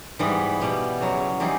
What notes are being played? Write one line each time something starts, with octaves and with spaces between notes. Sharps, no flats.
G#2 E3 G3 B3
B2 G3 B3
E2 C#3 F#3
E3 G3 C4 D#4 G#4